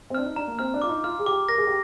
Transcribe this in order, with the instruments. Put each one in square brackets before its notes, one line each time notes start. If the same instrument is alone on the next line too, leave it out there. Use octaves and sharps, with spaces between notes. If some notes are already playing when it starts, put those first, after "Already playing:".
[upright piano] C4
[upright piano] D4 [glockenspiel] F6
[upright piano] D#4
[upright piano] D4 [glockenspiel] A#5
[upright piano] A#3
[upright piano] C4 [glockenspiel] F6
[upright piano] D4
[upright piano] F4 [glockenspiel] D6
[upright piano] D#4
[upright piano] F4 [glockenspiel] F6
[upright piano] G#4
[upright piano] G4 [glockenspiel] D6
[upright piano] A#4 [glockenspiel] A#6
[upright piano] G#4
G4